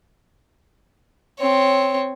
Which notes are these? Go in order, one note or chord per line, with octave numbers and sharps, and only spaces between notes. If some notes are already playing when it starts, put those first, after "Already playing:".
C4 C#5